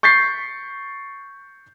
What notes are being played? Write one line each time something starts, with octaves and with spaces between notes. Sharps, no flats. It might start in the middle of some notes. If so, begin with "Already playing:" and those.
C#6 G6 A6 B6 C7